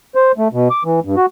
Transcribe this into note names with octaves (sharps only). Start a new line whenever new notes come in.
C5
A3
B2
D6
E3
G2
F#4